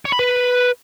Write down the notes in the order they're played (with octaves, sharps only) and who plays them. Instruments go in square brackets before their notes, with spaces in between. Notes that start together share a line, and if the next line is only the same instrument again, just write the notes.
[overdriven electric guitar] C#5
B5
B4